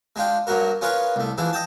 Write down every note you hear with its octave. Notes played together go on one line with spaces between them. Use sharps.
G#3 D4 F4 G5
G2 F#3 A#3 F#4 A#4
C#4 F4 G#4 A#4 B4 C#5
C2 A3
E3 F3 D4 G#4
D#5 G5 A5